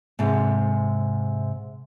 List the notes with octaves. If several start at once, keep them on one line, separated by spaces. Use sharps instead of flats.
G#2 C3